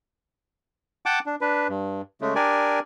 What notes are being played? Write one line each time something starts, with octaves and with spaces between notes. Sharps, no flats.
F#5 G5 A5 D6
D4
D4 B4
G2
C#3 G#3 A3
D4 G4 A#4 D5 G#5